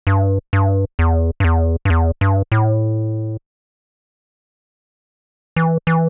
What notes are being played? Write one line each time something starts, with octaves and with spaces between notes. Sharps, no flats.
G2
G2
E2
G2
E2
G2
E2
G2
A2
E3
E3